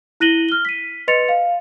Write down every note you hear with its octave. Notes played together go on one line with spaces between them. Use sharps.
E4 F#6 A#6 D#7 F#7 G7
F6 G7
B6 D#7
B4 D#5 C6 A6 C#7 F7
F5